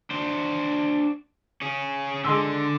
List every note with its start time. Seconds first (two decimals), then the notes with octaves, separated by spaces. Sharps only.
0.11 D4 C5
1.62 C#4 G#4
2.24 D3 G#3 C6 E6